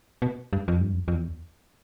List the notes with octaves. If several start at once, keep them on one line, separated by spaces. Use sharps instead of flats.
B2
G2
F2
G2
F2
F2
E2